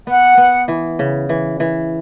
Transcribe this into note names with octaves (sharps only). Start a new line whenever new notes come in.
B3 F#5
B3
E3
C#3
E3
E3